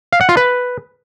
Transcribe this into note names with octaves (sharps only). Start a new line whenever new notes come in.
F5
F#5
F4
B4